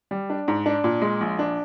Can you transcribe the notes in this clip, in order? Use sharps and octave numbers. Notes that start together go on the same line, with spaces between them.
G3
D4
G#2
D4
A#2
G#3
A#1
D4